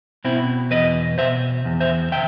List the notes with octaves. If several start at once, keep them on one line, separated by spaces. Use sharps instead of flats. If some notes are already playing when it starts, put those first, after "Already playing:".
B2 C4 E4
E2 B4 D#5
B2 C5 E5
E2
C5 E5
D#3 E5 G5